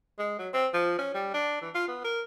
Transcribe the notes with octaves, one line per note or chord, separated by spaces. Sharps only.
G#3
F#3
C4
F3
C#4
G3
D4
E3
F4
B3
A#4